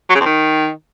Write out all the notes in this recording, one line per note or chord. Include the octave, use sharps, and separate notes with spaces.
F#3
C#3
F2
D#3